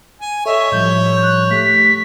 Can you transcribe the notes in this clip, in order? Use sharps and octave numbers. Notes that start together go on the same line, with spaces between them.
G#5
A4 C#5 D#5 E5
A2 F3 G3 G6
F#6
A3 G4 B6